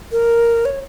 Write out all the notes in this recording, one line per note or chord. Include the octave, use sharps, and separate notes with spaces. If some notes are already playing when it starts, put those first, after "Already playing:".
A#4
C#5